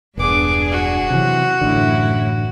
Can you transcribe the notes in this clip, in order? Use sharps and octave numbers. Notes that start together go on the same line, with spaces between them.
E1 G2 B3 D4 G#4 D6
F#4
C3 E3 F#3
A1 F#2 A2 D3 E4